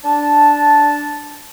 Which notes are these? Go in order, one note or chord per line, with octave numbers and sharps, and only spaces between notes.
D4 A5